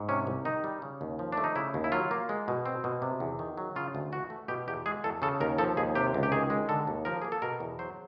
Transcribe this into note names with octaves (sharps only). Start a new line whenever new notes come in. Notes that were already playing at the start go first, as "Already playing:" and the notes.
Already playing: G#2
C3 C#4
C2
D#3 D#4
G3
C#3
D#2
F3
A3 D4
D#4
C#3 E4
D#2
E4
F#3 F4
A#3
G#3
B2
C4
B2
C3
E2
D#3
F#3
C#3 F4
D2
E3 F#4
A3
B2 G4
E2 G4
G#3 G#4
E2 A4
C#3 A4
D#2 A#4
F3 A4
D#2 G#4
C3 G4
C#2
G4
D#3 G#4
G#3
D3 A4
D#2
F3 A#4
A#3 G#4
A4
B2 A#4
E2
F#3 C5